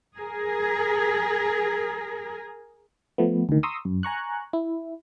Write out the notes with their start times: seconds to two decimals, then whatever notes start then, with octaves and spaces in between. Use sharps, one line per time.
0.19 G#4 A#4
3.18 F3 A3 B3
3.49 D2 D#3
3.63 A#5 C6 C#6 D#6 E6
3.85 F#2
4.03 G#5 A#5 C#6 F#6
4.53 E4